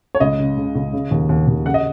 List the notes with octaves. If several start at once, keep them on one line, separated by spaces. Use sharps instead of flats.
C#5
C#2 D#5
C#3
C#3
C#2
C#3
D#2
D#2
D#2
C#3 F#5
D#5